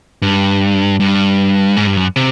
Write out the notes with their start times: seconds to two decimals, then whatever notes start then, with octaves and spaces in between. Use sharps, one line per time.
0.22 G2
1.00 G2
1.77 G#2
1.87 G2
1.97 F#2
2.16 C3